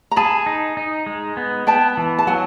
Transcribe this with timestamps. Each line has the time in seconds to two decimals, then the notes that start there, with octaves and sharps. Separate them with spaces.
0.11 A#5
0.16 G#4 A5 B5
0.46 D#4
0.77 D#4
1.06 G#3
1.37 B3
1.67 B3 G5 A5
1.97 E3
2.19 A5
2.27 F#3 F#5 G#5